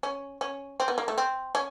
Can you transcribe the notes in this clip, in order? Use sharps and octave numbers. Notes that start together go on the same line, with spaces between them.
C#4
C#4
C4
B3
A#3
A3
C4
C#4